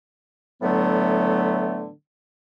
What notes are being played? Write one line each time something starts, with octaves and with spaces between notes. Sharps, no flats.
A2 D3 E3 F#3 A3 B3